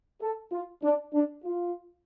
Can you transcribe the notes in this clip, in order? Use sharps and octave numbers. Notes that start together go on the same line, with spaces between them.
A4
F4
D4
D4
F4